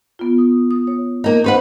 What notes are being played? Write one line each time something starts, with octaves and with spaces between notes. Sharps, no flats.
B3 F4
D#6
D#6
C#5
A#3 D#4
C#4 D#4 B4 C5 F#5